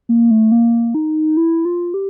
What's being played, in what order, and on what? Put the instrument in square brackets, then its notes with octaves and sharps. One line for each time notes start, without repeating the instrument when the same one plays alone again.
[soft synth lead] A#3
A3
A#3
D#4
E4
F4
G4